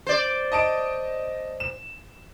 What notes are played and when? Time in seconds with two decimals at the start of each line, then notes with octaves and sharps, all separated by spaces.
0.07 C5 D5
0.52 D#5 A5 D7
1.60 E7